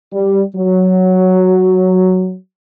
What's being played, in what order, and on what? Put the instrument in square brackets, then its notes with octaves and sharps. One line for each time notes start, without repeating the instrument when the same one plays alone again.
[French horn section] G3
F#3